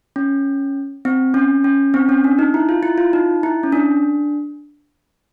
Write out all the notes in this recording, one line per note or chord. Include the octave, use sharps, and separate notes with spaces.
C#4
C4
C#4
C#4
C4
C#4
D4
D#4
E4
F4
E4
F4
D#4
E4
C#4
D4